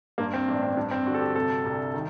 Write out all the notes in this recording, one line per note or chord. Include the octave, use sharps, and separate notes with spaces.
G2 A#3
C4
A1 D4
C4
G2 D4
C4
D3 F#4
A4
G4
C3 A4
C2
D#3